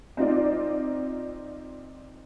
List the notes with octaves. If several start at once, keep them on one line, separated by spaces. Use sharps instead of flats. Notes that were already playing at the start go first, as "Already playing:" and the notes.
C4 D#4 F4 D5